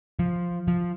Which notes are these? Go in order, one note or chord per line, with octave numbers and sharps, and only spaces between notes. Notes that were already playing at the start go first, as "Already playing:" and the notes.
F3
F3